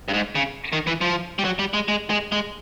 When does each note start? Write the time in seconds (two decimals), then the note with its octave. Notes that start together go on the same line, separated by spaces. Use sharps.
0.08 G2
0.14 G#2
0.35 C#3
0.73 D#3
0.87 E3
1.01 F3
1.39 G3
1.45 F#3
1.59 G3
1.74 G#3
1.88 G#3
2.10 G#3
2.32 G#3